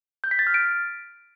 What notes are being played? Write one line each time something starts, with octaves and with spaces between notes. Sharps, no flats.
G6
B6
A6
F6
D7